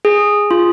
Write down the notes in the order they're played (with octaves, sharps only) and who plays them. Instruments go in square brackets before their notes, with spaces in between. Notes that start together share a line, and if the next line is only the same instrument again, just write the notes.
[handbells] G#4
F4